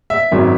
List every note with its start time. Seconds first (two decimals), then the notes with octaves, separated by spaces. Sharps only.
0.10 E5
0.31 G#1 F#2 D#3 F#3